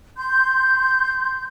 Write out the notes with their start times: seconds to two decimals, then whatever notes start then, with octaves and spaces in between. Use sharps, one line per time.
0.17 C6 G6